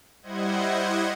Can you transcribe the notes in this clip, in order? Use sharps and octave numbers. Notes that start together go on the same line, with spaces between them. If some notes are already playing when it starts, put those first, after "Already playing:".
G3 E4 C5 D#5 F#5 G#6